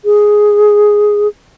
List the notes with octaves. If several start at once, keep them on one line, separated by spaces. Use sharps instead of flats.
G#4